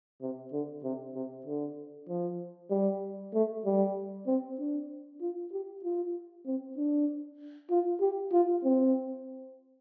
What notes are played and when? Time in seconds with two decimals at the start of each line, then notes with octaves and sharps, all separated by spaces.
0.21 C3
0.52 D3
0.83 C3
1.15 C3
1.46 D3
2.09 F3
2.70 G3
3.34 A3
3.65 G3
4.27 C4
4.59 D4
5.21 F4
5.52 G4
5.83 F4
6.46 C4
6.77 D4
7.70 F4
8.01 G4
8.32 F4
8.64 C4